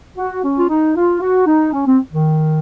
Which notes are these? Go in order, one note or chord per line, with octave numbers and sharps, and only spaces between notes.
F#4
C#4
F4
D#4
F4
F#4
D#4
C#4
C4
D#3